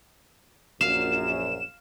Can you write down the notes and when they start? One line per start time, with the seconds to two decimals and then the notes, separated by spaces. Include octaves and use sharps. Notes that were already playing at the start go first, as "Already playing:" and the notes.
0.81 A#1 F#2 F5 E7